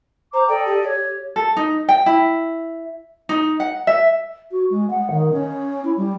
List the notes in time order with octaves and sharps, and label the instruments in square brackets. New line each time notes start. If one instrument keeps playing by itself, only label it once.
[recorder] C5 [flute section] A#5 D6
[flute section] A4 D5 D#5 [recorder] G5
[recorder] G4
[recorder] G4 [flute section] C#5
[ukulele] A4
D#4
G5
E4
D#4
F#5
E5
[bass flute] F#4
G#3
F#5
D#3
C#4
E4
G3